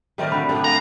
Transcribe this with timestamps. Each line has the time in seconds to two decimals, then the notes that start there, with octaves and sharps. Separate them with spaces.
0.18 D#3 G3 A3 C4 A#4 D5
0.32 D3 F#4 B5
0.49 G2 C#3 A3 D4 G4 A4
0.64 A#3 F5 F#5 A#5